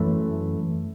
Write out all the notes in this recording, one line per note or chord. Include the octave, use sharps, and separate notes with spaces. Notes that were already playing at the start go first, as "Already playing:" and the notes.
Already playing: F#2 E3 A3